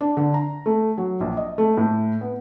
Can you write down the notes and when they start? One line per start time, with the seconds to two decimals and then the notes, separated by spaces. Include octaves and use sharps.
0.01 D4
0.17 D3
0.34 A#5
0.66 A3
0.98 F#3
1.21 A#1
1.37 D#5
1.58 A3
1.77 A2
2.21 B3